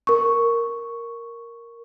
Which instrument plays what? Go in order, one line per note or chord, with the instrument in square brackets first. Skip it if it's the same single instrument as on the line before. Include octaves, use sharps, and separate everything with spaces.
[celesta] A#4 C#6